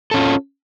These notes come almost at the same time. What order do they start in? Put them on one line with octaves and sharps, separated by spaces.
A4 C#4 F4